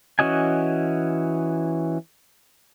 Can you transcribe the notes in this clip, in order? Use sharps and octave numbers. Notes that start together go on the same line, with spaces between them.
E3 C#4 F#4 D#5 G#5